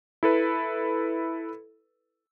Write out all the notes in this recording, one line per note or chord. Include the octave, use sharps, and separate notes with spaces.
E4 A4 B4